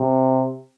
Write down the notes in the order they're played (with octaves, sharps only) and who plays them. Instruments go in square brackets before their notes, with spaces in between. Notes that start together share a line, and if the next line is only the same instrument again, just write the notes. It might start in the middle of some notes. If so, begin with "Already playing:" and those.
Already playing: [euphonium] C3